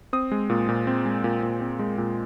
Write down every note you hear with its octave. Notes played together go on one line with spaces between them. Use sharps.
C4 D#6
G#3
A#2
A#2
C4
G#3
A#2
A#2
C4
G#3
A#2